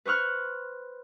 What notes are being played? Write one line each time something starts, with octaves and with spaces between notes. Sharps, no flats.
B4 C5 C#6 F6 F#6